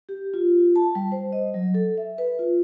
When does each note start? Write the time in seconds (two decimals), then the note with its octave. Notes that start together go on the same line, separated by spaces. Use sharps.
0.09 G4
0.34 F4
0.76 A5
0.95 G3
1.12 C5
1.33 D#5
1.54 F#3
1.74 A4
1.98 E5
2.18 B4
2.39 F4